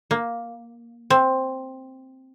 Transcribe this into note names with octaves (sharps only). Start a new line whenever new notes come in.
A#3
C4